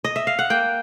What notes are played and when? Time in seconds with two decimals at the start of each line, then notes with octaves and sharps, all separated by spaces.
0.04 D#5
0.16 E5
0.27 F5
0.39 F#5
0.50 A#3 G5